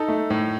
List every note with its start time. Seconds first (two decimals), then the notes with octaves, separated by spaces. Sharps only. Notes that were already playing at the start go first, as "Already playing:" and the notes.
Already playing: D#4 A4
0.08 A3
0.30 A2